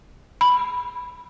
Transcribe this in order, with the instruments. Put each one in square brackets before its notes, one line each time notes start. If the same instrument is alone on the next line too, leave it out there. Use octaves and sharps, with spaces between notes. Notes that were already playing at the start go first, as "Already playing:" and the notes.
[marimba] B5